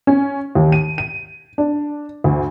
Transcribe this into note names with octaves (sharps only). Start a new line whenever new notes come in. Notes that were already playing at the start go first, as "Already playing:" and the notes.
C#4
D#2
D#7
D#7
D4
D2